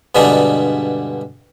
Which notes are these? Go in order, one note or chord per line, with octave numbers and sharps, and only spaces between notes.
G2 B2 D3 G#3 D4